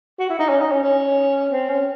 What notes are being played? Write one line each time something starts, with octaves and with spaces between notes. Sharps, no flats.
F#4
E4
D#4
C#4
D#4
C#4
C#4
C4
C#4